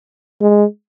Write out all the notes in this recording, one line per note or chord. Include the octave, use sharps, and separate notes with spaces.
G#3